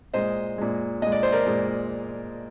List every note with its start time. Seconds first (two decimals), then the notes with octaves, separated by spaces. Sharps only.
0.14 A#2 G#3 C5 D#5
0.58 A#2 G#3
1.02 A#2 G#3 D#5
1.12 D5
1.23 C5
1.32 A#4 D5
1.47 A#2 G#3